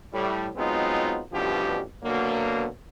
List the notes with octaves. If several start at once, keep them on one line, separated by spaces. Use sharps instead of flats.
A2 G3
F#3 G#3 B3 C4 D#4 F4
A1 G2 B2 D3 F3 G4
B2 D3 F#3 A#3